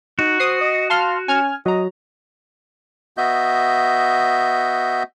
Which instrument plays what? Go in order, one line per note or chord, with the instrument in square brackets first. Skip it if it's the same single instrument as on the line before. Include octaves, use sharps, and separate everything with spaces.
[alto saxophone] D#4 [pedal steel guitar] F#4
[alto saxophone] C5 [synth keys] D#6 C7
[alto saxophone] D#5
[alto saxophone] F5 [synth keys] A5 C6 F6
[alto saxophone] C#4 [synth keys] G#5 F6 G#6
[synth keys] F#3 A#5 [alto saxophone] D#5
[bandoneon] B3 F#4 D#5 E5 G6